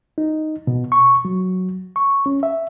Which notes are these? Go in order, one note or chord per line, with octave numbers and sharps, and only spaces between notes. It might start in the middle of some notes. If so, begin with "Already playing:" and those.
D#4
B2
C#6
F#3
C#6
C#4
E5